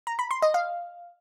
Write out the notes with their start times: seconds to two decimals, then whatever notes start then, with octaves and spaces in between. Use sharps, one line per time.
0.07 A#5
0.19 B5
0.31 C6
0.42 D#5
0.54 F5